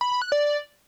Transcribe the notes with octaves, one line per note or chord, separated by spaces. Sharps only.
B5
B5
F#6
D5